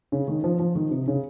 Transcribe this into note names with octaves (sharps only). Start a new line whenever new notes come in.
C#3
D#3
F3
F3
D#3
C3
C#3